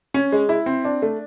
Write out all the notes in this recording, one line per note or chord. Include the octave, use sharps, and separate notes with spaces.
C#4
G#3
E4
C4
D4
A3